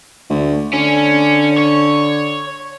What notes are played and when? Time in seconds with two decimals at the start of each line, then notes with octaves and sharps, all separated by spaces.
0.29 D2
0.73 D3 C#4
1.58 C#5